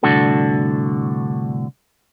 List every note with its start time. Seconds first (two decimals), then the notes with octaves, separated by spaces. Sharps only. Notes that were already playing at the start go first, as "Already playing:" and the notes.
0.03 C2 A2 D3 D4 F#4 A4